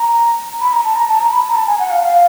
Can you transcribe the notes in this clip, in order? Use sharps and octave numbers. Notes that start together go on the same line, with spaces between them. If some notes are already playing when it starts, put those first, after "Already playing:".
Already playing: A#5
B5
A#5
A5
A#5
A5
A#5
B5
A#5
A5
G#5
F#5
F5
F5